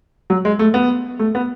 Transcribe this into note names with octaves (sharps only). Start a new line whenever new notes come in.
F#3
G#3
A3
B3
A3
B3